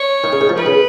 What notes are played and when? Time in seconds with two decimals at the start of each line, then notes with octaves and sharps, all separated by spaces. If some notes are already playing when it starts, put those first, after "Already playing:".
Already playing: C#5
0.24 D#3
0.33 C#3
0.41 D#3
0.49 F3
0.58 D#3 B4
0.66 C#3